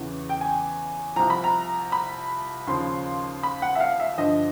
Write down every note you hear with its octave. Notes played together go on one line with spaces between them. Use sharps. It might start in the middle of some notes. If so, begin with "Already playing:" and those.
Already playing: E2 C#3 E3
G5
G#5
C2 C3 F3 A#5
B5
A#5
B5
D#2 C#3 F3 C6
B5
F#5
E5
F5
E5
G2 D3 F3 D#5